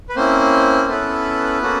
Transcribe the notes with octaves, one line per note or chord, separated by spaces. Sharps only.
B4
A#3 C4 C#4 E4 C5
B3 C#4 E4 A4 B4
A#3 C#4 F#4 A4